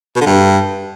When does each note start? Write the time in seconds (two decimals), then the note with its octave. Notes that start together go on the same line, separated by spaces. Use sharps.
0.16 B2
0.21 D3
0.26 G2